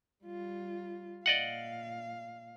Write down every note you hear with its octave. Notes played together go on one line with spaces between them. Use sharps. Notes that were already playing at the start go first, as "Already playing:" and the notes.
G3 F4
A#2 D5 D#5 F5 F#5